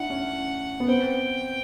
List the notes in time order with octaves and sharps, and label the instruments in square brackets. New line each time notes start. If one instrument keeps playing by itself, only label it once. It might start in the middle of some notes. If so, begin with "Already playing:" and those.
Already playing: [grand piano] D4 E4 [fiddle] F#5
[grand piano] C#4
B3
[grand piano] C4 [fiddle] G5